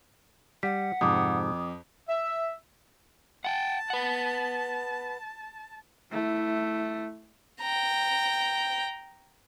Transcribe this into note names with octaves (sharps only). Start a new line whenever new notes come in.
G3 F#5 B6
F2 G#2 C3 D6 D#6
E5
F#5 G5 A5
B4 F#5
A3 E4
G5 A#5